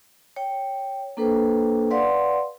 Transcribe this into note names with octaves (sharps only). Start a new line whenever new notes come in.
C#5 G5
A#3 D4 A4 B4 C5 G5
B4 D5 F5 F#5 C6